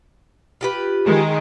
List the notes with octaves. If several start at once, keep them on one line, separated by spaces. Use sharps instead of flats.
F4 G4 B4
D#3 G#3